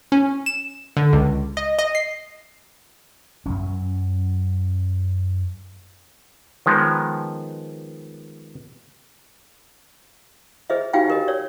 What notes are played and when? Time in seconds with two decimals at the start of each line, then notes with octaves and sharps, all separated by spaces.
0.12 C#4
0.46 E7
0.97 D3
1.13 C#2
1.57 D#5
1.79 D#5
1.95 C7
3.46 F#2 F#3 C#4
6.66 D#3 F3 G#3 B3
10.70 G#4 C5 D#5 E5
10.93 D#4 F#4 G4 F5 G5 G#5
11.08 G4 A#4 D#5
11.28 C#5 D5